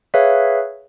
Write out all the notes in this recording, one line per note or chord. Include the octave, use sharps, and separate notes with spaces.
G#4 B4 C#5 E5 F5